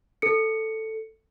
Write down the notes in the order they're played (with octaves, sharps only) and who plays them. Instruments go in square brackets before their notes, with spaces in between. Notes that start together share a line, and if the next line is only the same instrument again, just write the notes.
[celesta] A4 C#7